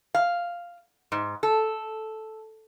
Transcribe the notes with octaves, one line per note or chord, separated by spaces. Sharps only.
F5
G#2
A4